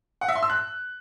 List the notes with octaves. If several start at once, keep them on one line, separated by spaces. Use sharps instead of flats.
F#5
E5
C6
E6
F#6